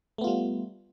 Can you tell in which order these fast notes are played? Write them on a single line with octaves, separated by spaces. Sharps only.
A3 B3 F4 G3